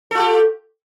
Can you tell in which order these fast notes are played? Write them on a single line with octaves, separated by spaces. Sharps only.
A4 F4 G4